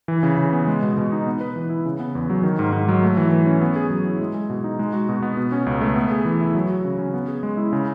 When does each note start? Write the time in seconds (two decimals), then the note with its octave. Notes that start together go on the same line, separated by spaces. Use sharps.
0.08 E3
0.23 C#3
0.38 C#3
0.53 B3
0.67 G#3
0.82 B2
0.97 B2
1.12 D#4
1.27 B3
1.41 B4
1.56 E3
1.70 E4
1.85 C#3
1.99 B3
2.15 E2
2.30 F#3
2.43 D#3
2.59 G#2
2.73 G#2
2.88 F#3
3.03 A3
3.17 E3
3.31 E3
3.46 C#4
3.61 B3
3.76 G#4
3.90 F#3
4.05 E4
4.21 G#3
4.35 G#4
4.50 B2
4.64 D#4
4.79 G#3
4.93 F#4
5.09 B2
5.22 B3
5.37 B2
5.52 C#4
5.66 C#2
5.81 A3
5.96 B3
6.12 G#4
6.25 E3
6.41 E4
6.55 F#3
6.70 F#4
6.85 C#3
6.99 C#4
7.14 B3
7.28 G#4
7.43 G#3
7.57 E4
7.73 C#3